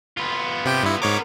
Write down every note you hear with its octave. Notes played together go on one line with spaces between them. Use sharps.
B3 F4
C3 G4 G5
G2 E4
G#2 B3 A#4 C#5 D6